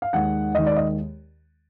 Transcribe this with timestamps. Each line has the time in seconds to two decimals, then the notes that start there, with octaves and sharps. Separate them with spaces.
0.02 F5
0.13 D#2 D#3 G#3 F#5
0.55 D#2 D#3 G#3 D#5
0.66 D5
0.77 D#5